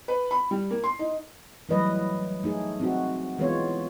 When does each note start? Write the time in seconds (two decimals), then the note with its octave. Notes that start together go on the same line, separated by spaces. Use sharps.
0.08 B4
0.31 B5
0.51 G3
0.71 A#3
0.84 C6
0.99 D#4
1.69 E3 F#3 G3 A3 B4 D#5
2.44 A3 D#4 G#4
2.80 C4 D#4 F#4
3.38 E3 G#3 B3 F4 C#5